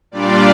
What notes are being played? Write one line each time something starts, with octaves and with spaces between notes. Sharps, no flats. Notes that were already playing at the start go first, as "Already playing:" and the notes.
A#2 G3 D4 F4 D5